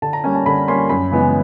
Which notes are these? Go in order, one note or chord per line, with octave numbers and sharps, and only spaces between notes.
D3 A5
A#5
G3 A#3 C#4 G#5
A5
D3 B5
G3 A#3 C#4 C6
F#2 B5
C#3 E3 G#3 B3